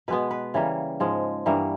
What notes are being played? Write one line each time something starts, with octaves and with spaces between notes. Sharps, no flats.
B2 G#3 B3 B4
B4
C#3 E3 G3 A#3
G#2 F3 G#3
G2 E3 G3 A#3